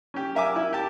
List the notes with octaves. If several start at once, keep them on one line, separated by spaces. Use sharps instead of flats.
C#4 G4
A#4 E5 G#5 D6 E6
E4
G4 A5